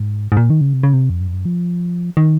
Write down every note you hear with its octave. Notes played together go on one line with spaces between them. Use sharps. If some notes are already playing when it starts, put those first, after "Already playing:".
Already playing: G#2
G#2
A#2
D#3
C#3
C3
C#3
C3
F2
F#2
F2
F#2
F3
D#3